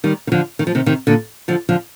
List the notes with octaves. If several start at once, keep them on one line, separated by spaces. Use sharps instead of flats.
D#3 G3
D#3
D3 F3
D#3
F3
C3 D#3
C3 D#3
A#2 D3
D3 F3
D3 F3